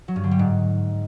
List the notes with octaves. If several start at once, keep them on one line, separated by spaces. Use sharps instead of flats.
F#3
G2
D3
G3
G#2